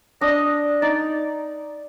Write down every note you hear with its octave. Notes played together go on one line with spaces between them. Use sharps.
D4 D#5
D#4 D5